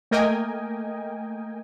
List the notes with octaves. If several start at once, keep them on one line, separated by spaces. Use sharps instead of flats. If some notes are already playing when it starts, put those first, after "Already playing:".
A3 A#3 A#4 D#5 G5 G#5